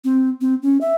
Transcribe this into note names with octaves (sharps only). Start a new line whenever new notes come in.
C4
C4
C#4
E5